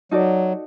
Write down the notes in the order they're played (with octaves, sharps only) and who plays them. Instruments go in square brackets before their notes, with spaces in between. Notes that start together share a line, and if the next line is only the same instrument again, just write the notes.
[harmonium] F#3 [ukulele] D#4 F#4 A4 D5